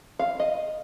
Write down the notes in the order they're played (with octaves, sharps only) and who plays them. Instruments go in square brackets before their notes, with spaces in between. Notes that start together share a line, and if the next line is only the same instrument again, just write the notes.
[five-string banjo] F5
D#5